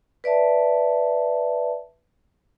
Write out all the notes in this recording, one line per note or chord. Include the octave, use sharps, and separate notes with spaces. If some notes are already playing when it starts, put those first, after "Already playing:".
B4 D5 E5 A5